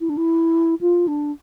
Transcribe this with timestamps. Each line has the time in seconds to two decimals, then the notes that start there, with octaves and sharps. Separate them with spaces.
0.01 E4
0.09 D4
0.17 E4
0.81 F4
1.08 D4